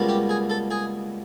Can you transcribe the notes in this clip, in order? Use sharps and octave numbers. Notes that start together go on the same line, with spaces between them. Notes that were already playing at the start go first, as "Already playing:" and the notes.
Already playing: C#2 B2 G3 A#3
G4
G#4
A4
G#4